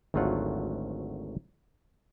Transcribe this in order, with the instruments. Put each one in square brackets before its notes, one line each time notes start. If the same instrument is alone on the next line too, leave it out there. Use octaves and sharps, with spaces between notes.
[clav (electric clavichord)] G#1 D2 F#3 A3 F4 F#5